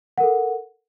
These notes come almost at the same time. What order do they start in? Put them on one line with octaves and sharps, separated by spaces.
F#5 A#4 A4